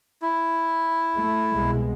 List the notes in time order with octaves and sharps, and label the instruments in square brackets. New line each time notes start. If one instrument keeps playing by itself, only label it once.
[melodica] E4
[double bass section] A3
C2 B2 G#3